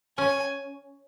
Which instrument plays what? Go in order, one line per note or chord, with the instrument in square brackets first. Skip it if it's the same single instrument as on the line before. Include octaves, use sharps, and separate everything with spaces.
[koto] C#4 [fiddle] G#5